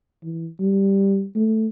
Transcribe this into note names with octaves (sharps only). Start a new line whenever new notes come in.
E3
G3
A3